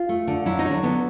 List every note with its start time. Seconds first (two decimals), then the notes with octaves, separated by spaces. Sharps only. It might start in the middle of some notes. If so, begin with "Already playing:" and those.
Already playing: F4
0.09 A3
0.27 D3
0.46 F#3 E4
0.59 D#4
0.65 F#3
0.71 D4
0.83 D3 B3